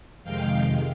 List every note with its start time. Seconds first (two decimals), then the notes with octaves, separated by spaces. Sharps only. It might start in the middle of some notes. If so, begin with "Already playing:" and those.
0.23 F2 C3 D#3 G#3 F5 G5